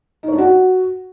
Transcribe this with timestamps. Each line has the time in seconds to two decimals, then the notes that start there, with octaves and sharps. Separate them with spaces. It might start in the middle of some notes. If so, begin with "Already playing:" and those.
0.23 D#4
0.28 C#5
0.33 D4
0.38 F#4